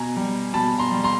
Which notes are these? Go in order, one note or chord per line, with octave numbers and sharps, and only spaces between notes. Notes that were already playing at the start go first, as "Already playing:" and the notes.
Already playing: B2 G#5 A#5
G3
B2 A5 B5
A#5 C6
G3
A#5 C6